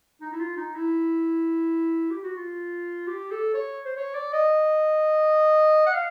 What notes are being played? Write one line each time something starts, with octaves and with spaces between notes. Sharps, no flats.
D#4
E4
F4
D#4
E4
G4
F#4
F4
G4
A4
C#5
C5
C#5
D5
D#5
F#5
F5